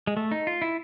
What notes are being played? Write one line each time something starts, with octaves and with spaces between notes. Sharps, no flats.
G#3
A3
D#4
F4
E4